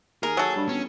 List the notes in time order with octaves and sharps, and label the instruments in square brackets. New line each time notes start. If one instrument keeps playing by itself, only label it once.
[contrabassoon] D#2 [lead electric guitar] G#4 [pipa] A#4
[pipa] F#3 A4
[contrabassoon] G2
[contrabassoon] G1 [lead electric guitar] C#4